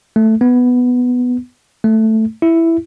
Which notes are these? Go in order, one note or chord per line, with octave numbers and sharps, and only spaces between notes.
A3
B3
A3
E4